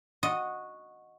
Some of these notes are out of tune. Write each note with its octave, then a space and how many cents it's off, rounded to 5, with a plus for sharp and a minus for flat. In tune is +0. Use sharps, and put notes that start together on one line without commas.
F#4 -10 D#5 +0